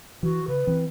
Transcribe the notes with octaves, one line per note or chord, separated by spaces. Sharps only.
E3 F#4
C#3 B4
E3 C4